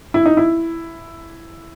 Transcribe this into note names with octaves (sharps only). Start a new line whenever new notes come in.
E4
D#4
E4